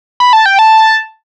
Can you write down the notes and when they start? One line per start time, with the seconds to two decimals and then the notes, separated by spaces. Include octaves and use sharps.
0.20 B5
0.33 A5
0.46 G5
0.59 A5